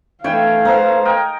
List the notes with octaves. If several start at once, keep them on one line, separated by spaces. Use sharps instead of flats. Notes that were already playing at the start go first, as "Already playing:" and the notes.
E3 A3 D4 C#5 E5 F5 G5 G#5
B3 D#4 C5 F#5
A#4 D#5 G5